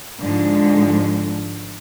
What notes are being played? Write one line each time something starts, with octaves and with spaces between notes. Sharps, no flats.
G#2 D3 F3 G#3